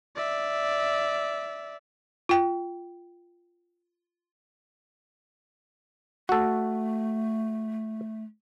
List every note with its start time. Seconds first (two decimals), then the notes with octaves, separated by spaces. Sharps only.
0.16 D5 E5
2.29 F4 G5
6.29 A3 F#4 A4